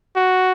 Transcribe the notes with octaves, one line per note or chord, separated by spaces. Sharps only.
F#4